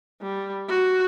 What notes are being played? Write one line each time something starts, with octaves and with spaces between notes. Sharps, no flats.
G3
F#4